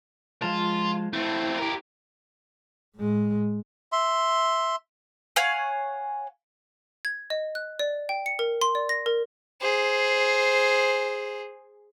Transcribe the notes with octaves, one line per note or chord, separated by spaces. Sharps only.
F3 G#3 F4 A5
A3 C4 E4
G4 A#4
A2 G#3
E5 C6
C#5 F5 F#5 G#5
G#6
D#5
F#6
D5
G5
C#7
A#4
C6
D5
A#6
A#4
G#4 C5